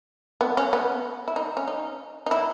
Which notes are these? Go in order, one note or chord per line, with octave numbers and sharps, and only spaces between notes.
B3
C#4
B3
E4
D#4
C#4
D#4
D#4
E4